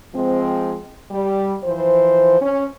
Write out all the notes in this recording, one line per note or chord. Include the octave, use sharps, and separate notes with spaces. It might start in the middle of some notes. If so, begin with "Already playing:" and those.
F3 G#3 C4
G3
E3 F3 C5
C#4